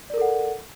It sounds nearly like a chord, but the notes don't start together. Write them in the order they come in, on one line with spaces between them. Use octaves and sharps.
D5 A#4 A4 F#5